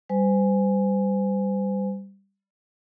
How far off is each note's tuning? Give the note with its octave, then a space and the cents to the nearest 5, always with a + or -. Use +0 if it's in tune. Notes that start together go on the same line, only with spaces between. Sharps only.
G3 +0 C5 -40 G#5 +0